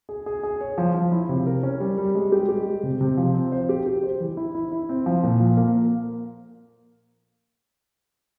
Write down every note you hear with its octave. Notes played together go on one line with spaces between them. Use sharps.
G#4
G#4
G#4
C#5
F3
F3
E4
C3
A#4
C#4
G3
G3
G#3
G4
G4
G#3
C3
C3
F3
C4
C5
G4
G4
C5
E3
E4
E4
E4
C4
F3
A#2
F3
A#3